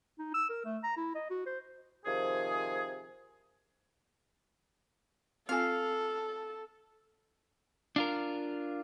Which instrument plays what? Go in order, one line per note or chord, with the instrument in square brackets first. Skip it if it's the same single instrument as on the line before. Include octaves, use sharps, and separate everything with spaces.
[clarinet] D#4
E6
A#4
A3
A#5
E4
D#5
F#4
C5
[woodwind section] C3 D#3 F3 G#4
[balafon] C4 F4 G#5 [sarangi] A4 [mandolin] F5
[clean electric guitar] D4 F4 A#4